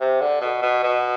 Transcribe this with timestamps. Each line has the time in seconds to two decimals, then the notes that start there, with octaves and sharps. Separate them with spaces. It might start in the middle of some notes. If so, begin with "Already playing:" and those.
0.01 C3
0.21 D3
0.41 B2
0.62 B2
0.84 B2